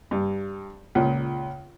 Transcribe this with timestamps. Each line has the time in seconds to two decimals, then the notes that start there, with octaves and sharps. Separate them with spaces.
0.11 G2
0.95 C#2 A#2